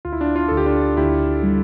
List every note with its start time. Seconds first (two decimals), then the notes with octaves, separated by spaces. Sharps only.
0.05 D2 F4
0.13 E4
0.21 D4 F4
0.36 D4 F4
0.48 D2 A4
0.57 G4
0.66 D4 F4
0.97 D2 E4 G4
1.43 G3